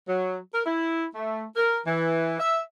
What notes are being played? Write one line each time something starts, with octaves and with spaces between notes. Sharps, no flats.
F#3
A#4
E4
A3
A#4
E3
E5